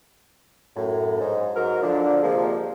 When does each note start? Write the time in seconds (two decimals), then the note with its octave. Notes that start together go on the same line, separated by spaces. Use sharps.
0.76 F#2 A2
1.20 G#2
1.56 G#2 F#3 A#4
1.83 D3 F3 D4
2.23 F2 C3 F3 G#3 A#3